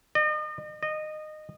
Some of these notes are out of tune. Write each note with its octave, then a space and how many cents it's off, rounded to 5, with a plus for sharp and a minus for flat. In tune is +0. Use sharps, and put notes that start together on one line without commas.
D#5 -40
D#5 -20